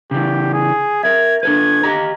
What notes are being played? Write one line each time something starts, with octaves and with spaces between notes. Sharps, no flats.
C#3 E3 G4
G#4
A#4 E5 G#6
D4 A4 B4 G#6
G4 D#5 A#5